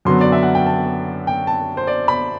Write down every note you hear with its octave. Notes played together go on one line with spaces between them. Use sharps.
F#2 D3 F#3 B3 C6
D5
E5
F#5
G5
A5
G5
A5
C5
D5
B5